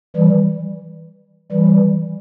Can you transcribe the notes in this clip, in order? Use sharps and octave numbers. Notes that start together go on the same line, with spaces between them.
E3 G3
E3 G3